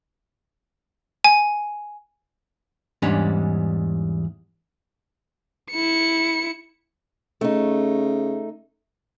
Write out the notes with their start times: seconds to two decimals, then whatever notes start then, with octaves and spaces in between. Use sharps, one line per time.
1.24 G#5
3.02 E2 G#2 G3 C#4 D4
5.71 E4 C#7
7.41 C#3 A3 D#4